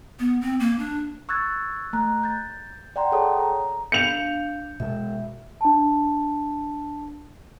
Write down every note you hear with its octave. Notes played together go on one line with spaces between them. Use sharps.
B3
C4
A#3
D4
C#6 E6 F#6 G#6 A6
A3 A#5 F#6
G6 A6
D5 F#5 G5 A#5 C6
G#4 A4 C#5 G5 A5 D#6
A#5
D4 F5 G6 C#7 F7
B2 G#3 E5
D4 A5